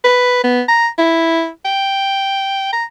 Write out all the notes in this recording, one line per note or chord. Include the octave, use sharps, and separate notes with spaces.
B4
B3
A#5
E4
G5
A#5